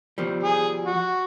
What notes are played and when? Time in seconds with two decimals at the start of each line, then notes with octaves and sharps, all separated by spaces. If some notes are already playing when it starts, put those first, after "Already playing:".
0.18 B2 F3 G3
0.43 G#4
0.85 F#4